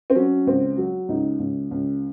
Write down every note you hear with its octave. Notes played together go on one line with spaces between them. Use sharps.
C4
F#3 C#4
C#2 C4
F#3
C#2 D#4
C#2
C#2